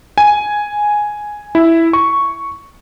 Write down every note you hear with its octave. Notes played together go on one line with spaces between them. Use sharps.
G#5
E4
C#6